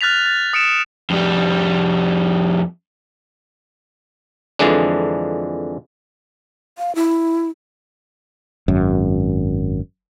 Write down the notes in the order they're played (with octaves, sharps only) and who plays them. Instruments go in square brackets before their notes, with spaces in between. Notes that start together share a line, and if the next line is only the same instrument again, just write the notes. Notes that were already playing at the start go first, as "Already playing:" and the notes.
[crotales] F6 F#6 A6 B6 F7
A6
D#6 C#7 D7 E7
[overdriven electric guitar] F2 G3
[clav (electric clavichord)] F2 D3 E3 G#3 D4
[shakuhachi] F5
E4
[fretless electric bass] G#1 F#2